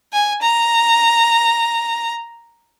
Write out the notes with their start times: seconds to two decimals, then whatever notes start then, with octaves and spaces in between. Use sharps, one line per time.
0.13 G#5
0.42 A#5